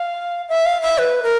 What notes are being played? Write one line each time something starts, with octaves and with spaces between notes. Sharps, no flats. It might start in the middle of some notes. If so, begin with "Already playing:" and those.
Already playing: F5
E5
F5
E5
B4
A#4